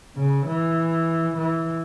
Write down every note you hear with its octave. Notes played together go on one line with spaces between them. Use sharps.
C#3
E3
E3